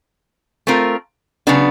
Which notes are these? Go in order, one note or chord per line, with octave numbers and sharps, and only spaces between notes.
A3 C4 F4 A#4
C#3 F#3 B3 D4